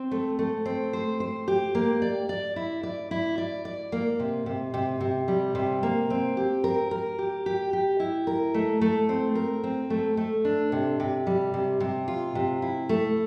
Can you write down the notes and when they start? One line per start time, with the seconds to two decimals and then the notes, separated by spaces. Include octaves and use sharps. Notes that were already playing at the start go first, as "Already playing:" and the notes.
Already playing: C4
0.11 A3
0.39 A3
0.66 C4
0.93 C5
1.20 C5
1.48 G4
1.75 A#3
2.02 D5
2.29 D5
2.56 E4
2.83 D5
3.11 E4
3.38 D5
3.65 D5
3.92 A#3
4.20 C3
4.46 C3
4.74 C3
5.01 C3
5.28 G3
5.55 C3
5.83 A#3
6.10 C4
6.37 G4
6.64 A#4
6.91 A#4
7.19 G4
7.46 G4
7.73 G4
8.00 E4
8.27 A#4
8.54 A3
8.81 A3
9.09 C4
9.35 A#4
9.64 C4
9.90 A3
10.17 A3
10.45 D4
10.72 C3
11.00 C3
11.27 G3
11.54 C3
11.80 C3
12.08 F4
12.35 C3
12.62 E4
12.89 A3